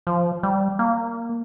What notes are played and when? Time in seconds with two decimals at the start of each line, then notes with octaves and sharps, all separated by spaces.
0.07 F3
0.43 G3
0.79 A#3